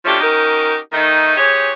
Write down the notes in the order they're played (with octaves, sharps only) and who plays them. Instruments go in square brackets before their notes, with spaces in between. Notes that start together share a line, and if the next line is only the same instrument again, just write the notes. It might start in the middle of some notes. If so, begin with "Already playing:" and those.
[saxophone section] B2 F3 A3 C#4 D4 G4
C#4 D#4 F#4 G4 A#4
D#3 A3 D#4
E3 G4 G#4 C5 C#5